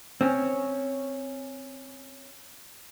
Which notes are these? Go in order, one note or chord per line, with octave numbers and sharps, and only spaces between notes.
C4 C#4